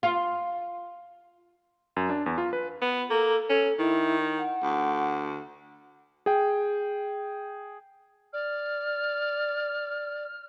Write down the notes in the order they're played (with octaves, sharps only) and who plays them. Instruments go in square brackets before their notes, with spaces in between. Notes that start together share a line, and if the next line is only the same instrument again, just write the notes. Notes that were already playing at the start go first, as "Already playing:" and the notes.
[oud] F4
[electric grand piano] F#2
D4
E2
F4
B4
[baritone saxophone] B3
[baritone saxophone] A#3 [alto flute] A4
[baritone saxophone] C#4 [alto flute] A4
[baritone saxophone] D#3 [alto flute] E4
[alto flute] F#5
[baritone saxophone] D2
[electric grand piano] G#4 G5
[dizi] D5 [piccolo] F6